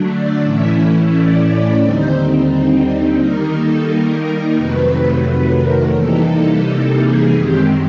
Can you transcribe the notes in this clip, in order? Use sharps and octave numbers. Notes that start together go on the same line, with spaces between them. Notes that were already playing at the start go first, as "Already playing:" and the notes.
Already playing: D3 F#3 A3 D4
D5
A2 E3 A3 C#4 E4 E5
D5
D#2 D3 G3 C4 D#4 C5
D#3 G3 A#3 D#4 A#4
A4
A#4
F2 C3 D#3 F#3 A3 B4
B4
A#4
C3 E3 G3 A#3 D#4 A4
A4
A4
G#4
F#2 D#3 G#3 C4 G4